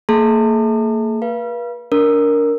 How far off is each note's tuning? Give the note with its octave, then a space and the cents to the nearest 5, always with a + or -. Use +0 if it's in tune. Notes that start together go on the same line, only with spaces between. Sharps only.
A#3 -35 G#4 +35 A5 +45
B4 -40 F5 -30
D4 -25 A#4 +0